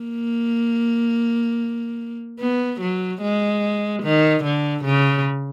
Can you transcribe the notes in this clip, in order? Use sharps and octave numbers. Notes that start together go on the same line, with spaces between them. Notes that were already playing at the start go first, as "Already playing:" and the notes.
Already playing: A#3
B3
F#3
G#3
D#3
D3
C#3